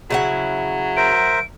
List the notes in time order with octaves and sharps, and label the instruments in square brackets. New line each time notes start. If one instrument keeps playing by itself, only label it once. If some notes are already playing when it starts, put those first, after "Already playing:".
[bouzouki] C#3 E4 F#5 [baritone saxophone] F#3
[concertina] A#4 C5 E5 [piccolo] D7